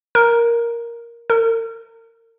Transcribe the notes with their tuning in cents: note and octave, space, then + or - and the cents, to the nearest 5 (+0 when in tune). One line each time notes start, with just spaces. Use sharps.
A#4 +5
A#4 -35